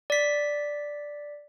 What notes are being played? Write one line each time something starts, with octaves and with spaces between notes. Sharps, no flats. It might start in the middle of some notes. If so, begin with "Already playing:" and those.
D5 B6